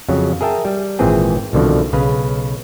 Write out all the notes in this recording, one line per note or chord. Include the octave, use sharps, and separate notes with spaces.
F2 C#3 F#3
G#4 A#4 E5 G5 A5
G3
G#1 A#2 E3 C4 G#4 G5
C2 B2 D3 D#3 F3
B1 C#3 B4 F5